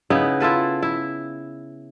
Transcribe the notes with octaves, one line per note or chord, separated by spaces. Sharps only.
C#3 B3 D#4 E4
E4 F4 A4 B4
E4